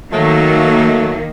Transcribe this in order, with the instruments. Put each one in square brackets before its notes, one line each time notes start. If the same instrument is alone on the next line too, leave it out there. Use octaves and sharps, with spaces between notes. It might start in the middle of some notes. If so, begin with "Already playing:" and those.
[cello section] D#3 A#3 [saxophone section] F#3 A3